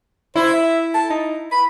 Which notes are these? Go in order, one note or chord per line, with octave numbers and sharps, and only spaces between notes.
E4 C5
E5
A5
D#4
B5